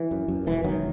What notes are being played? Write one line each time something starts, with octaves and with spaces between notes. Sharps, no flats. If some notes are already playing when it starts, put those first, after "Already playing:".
Already playing: E3
F#2
F#2
E1 E3
E1 D#3 F#3